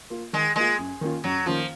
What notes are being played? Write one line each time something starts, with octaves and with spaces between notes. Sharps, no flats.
A#3 F4
D#3 G#3
G#3 A#3 F4
F#2
D#3 A#3 C#4 F4
F#2 F#3
D#3 F3 A#3 C#4 F4